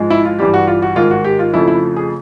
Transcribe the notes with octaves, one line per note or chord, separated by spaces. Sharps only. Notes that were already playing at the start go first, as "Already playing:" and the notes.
Already playing: G#2 F3 G#3
E4
F4
G2 E3 G3 G4
F#4
F4
F#4
G#2 D#3 G#3 F4
F#4
G4
F4
F2 C#3 F3 A3 E4
E4
G#4